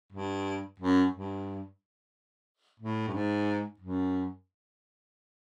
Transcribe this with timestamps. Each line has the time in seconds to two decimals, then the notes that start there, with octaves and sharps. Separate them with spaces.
0.12 G2
0.80 F#2
1.13 G2
2.79 A2
3.08 G2
3.13 G#2
3.79 F#2